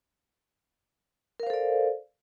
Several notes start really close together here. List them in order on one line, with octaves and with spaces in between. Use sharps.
A#4 F5 C5 A4 D5